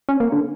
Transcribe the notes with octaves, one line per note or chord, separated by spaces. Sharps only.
C#4
A#3
D3